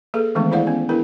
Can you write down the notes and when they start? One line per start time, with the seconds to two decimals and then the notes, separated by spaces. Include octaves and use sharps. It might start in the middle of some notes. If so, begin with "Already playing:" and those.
0.14 A#3 G#4 A4 B4
0.35 D#3 E3 G#3 A3 B3 D4
0.51 E4 G#4 C5 D5 F5 F#5
0.67 B3 C#4
0.89 B3 D4 E4 G#4 A#4 B4